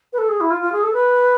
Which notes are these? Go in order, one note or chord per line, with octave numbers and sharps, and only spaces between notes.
B4
A4
G#4
E4
F4
F4
G#4
A4
B4